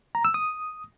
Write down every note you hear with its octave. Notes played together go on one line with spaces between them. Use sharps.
A#5
E6
D#6